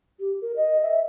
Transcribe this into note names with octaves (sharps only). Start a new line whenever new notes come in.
G4
A#4
D#5
E5